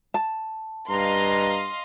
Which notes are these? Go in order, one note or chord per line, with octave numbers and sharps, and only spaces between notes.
A5
G2 D#5 F5 A#5 C6